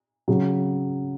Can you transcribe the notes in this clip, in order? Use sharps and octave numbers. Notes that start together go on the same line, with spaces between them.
C#3 F#3